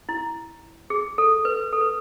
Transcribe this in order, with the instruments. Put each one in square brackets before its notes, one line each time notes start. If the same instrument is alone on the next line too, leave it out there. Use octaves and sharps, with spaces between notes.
[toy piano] E4
G#4
A4
B4
A4
B4